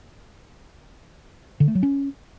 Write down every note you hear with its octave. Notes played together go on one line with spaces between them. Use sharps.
D3
A3
F#3
C#4